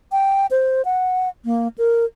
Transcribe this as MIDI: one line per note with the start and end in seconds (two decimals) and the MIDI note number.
0.12 0.46 79
0.51 0.85 72
0.85 1.29 78
1.45 1.68 58
1.78 2.05 70